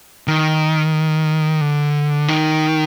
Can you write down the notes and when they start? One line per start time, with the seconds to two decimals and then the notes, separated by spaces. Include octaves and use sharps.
0.28 D#3
1.61 D3
2.28 D#3